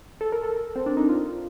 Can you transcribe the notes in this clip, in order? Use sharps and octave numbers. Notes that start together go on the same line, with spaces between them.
A4
A#4
A4
C4
D4
D#4
F4